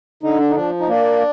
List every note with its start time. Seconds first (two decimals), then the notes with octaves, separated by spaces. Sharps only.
0.23 D3 D#4
0.39 D4
0.50 D#4
0.56 F3 D4
0.80 D#4
0.88 A#3 D4